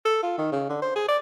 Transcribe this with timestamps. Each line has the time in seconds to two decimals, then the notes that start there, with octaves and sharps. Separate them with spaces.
0.05 A4
0.23 F4
0.38 D#3
0.52 C#3
0.69 D3
0.82 C5
0.96 G#4
1.08 D5